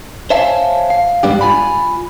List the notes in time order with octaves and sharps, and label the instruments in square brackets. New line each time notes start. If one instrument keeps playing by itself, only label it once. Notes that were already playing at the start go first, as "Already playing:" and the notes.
[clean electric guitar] C5 C#5 E5 F5 G#5 A5
F5
G#2 G3 B3 D4 G4
F4 G#5 B5